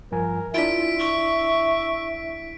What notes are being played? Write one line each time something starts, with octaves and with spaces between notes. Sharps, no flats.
G2 F3 A#4 G#5
D4 E4 F4 E5 B6 D7
C#6